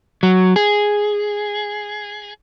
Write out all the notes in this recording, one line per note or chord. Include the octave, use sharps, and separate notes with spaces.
F#3
G#4